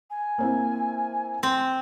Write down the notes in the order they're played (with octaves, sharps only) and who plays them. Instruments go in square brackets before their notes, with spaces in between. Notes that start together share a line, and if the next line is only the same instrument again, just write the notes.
[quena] G#5
[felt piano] A#3 C4 E4
[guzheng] C4